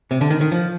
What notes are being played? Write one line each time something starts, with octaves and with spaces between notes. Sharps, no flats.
C3
D3
D#3
D#3
F3